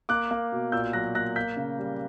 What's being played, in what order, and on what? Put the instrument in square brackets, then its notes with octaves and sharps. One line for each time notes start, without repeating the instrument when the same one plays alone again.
[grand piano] A#3 D6 F#6
A#3
B2
A#2 E6 G6
F#3 F#6 A#6
A#3 F#6 A#6
A#3 G6 B6
C#3
G3